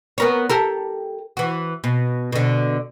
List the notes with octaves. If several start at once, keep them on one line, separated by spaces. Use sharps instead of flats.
B3 A#4 C#5
G4 A4 A#4
E3 F#4
B2
B2 D3